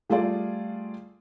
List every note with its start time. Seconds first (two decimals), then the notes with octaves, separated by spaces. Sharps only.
0.10 G3 A3 F4 G#4 D5